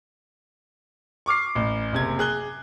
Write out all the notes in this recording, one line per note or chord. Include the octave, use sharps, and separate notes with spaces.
C#6 D6 F6 C7
A1
F#1 C3 G#6
G#4 F#6 G7